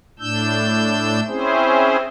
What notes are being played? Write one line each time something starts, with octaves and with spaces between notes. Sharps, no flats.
A2 D4 E6 G6
C4 C#4 E4 G#4 C5